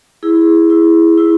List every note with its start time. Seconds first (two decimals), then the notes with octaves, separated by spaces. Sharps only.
0.23 E4 G#4
0.70 E4
1.18 E4